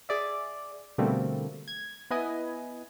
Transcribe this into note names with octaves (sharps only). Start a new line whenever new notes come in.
G#4 D5 E5
B2 D3 G3 A3 A#3 C4
G#6
B3 E4 B4 D#5 G#5